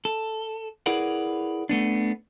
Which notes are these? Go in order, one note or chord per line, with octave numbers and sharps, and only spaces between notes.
A4
E4 G#4 A#4 B4 D5 F#5
A3 B3 D4